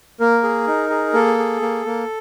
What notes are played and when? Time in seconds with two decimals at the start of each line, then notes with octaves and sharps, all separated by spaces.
0.20 A#3 A#4
0.43 G#4
0.67 D#4
0.90 G#4
1.14 A#3 A4
1.38 G#4
1.61 A#3
1.86 A#3